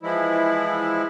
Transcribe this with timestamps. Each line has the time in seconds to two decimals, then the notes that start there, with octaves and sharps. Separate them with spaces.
0.03 E3 F3 G#3 E4